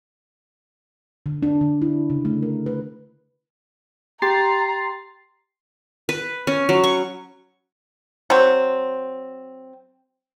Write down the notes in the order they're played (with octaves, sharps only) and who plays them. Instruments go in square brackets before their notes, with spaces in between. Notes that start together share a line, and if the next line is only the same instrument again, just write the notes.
[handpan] D3
D4
D3
E4
C#3
A3
A#4
B4
[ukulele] G4 [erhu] A#5 [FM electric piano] C6 A6 C7
[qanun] B4
C#4
F#3
C#6
[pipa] F#3 C4